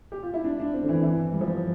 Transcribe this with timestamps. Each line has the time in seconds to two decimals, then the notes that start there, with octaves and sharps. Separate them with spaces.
0.12 G4
0.23 F4
0.34 E4
0.44 D4
0.60 D4
0.74 C4
0.83 D3
0.89 E3
1.03 E3
1.32 G3
1.41 F3